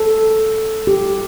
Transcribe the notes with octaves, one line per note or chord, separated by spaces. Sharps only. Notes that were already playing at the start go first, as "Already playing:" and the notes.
Already playing: A4
G4